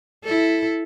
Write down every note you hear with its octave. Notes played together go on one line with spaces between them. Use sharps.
E4 A4